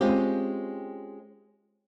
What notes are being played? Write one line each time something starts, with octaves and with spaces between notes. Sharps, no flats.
G#3 C4 C#4 F4 G4